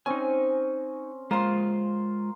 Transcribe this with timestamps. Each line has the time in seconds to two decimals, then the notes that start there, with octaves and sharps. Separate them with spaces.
0.06 C4 C#4 D#4 G#5
1.31 G#3 A#3 F4 C5 C6